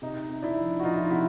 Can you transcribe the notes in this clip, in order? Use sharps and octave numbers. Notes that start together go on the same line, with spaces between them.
C3 D#4
C3
D4 E4
F3
F#4
F3 D#4 F4
E4
F4
C3 E4 F#4